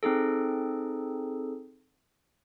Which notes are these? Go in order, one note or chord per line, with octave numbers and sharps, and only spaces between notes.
C4 D#4 G#4 A4